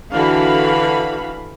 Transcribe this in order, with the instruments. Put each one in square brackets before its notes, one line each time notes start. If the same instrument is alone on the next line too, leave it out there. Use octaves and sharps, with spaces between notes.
[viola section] D3 E3 F#4 F5 B5